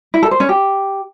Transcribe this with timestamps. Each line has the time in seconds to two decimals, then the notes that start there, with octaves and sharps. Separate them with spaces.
0.14 E4
0.23 A4
0.31 C5
0.40 C#4
0.49 G4